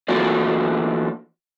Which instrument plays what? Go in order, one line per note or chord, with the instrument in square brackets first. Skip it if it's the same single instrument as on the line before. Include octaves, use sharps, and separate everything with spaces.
[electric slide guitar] E3 A3 A#3 F4 F#4 D5